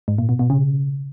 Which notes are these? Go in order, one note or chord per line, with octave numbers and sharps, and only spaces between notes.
G#2
A#2
B2
B2
C#3